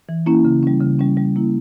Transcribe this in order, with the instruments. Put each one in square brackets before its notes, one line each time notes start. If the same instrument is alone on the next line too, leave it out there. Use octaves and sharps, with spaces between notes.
[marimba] E3
A#3 C#4 E4
C#3
G3 C#4
C#3
G3 C#4
G3
A#3 E4